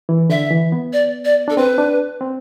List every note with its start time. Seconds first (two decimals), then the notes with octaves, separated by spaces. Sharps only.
0.09 E3
0.30 D3 E5
0.51 E3
0.72 B3
0.93 D5
1.25 D5
1.48 D4 A4
1.57 C4 B4
1.78 D4
2.21 C4